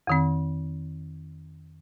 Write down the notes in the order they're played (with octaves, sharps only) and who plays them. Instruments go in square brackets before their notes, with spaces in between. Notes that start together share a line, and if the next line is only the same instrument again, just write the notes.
[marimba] F2 D#3 C4